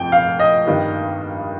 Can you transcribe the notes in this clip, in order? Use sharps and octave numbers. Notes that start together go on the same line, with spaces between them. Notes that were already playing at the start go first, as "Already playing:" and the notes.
Already playing: F1 F2 G5
F5
D#5
G2 D#3 G3 A#3 D4